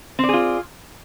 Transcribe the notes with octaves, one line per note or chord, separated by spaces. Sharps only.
C4 F4 G#4 D5